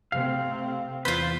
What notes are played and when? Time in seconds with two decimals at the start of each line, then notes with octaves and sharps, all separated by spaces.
0.12 C3 A3 C4 F5
1.05 E2 F4 B4 C5